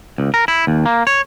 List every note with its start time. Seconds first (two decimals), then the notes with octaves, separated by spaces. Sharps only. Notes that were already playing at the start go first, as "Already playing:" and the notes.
0.18 C#2
0.34 A#4
0.48 E4
0.67 D#2
0.86 A#3
1.07 C#5